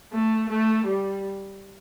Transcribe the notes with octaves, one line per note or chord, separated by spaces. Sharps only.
A3
A3
G3